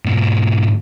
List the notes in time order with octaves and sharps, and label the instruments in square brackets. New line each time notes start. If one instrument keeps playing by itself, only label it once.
[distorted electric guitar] G#2 B2